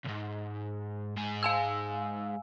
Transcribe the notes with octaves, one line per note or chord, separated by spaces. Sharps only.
B1 G#2
G#2 G#4
F5 G#5 E6